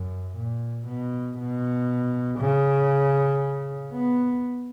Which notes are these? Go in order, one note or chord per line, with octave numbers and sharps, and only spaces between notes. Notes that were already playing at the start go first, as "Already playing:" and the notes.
Already playing: F#2
A#2
B2
B2
C#3
B3